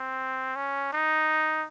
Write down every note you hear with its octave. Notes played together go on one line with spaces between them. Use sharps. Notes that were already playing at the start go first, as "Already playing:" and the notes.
Already playing: C4
C#4
D#4